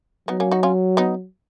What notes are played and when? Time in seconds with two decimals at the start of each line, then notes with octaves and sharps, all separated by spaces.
0.28 F#3 B3 D#4
0.40 A#3 C#4
0.51 D#4 F#4
0.63 C#4 F4
0.97 B3 D#4